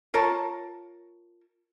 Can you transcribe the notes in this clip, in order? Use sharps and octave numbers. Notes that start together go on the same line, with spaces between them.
F4 A#4 C#5 A5